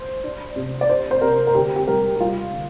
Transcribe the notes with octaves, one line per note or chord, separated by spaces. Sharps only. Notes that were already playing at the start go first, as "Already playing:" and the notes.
Already playing: C5
D4
C3
D5
D4 C5
C5
C3 A#4
A#4
D3 G4
G4
G3 A#4
G4
G3 F4
D3